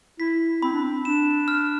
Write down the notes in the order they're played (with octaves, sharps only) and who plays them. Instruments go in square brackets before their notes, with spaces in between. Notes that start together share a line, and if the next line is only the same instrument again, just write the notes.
[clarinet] E4 [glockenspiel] B6
[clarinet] C4 [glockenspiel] B5
[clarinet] D4
C4
[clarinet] D4 [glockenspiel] E7
[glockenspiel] F6